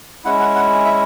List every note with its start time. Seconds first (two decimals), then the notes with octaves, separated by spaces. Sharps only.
0.24 G#3 C#4 E4 F#5
0.40 F#5
0.55 F#5
0.85 E5